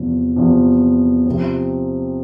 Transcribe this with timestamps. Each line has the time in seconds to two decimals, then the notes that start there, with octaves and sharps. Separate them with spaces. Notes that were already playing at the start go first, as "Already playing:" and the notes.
Already playing: E2 C3 F3
0.36 E2 C3 F3
1.26 C3 F3 C4